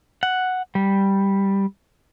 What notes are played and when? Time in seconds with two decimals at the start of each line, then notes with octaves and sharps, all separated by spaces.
0.23 F#5
0.75 G3